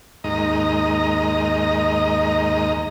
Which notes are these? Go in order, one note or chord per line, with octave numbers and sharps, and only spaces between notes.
D#2 G#2 D#5 A#5